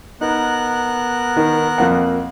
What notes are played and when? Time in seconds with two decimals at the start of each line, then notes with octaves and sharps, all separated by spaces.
0.21 B3 D#4 A#4 F#6
1.37 D#3
1.78 F2 A#3 F#5